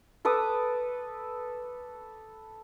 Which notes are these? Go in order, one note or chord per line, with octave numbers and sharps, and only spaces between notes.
A4 B4 D6 D#6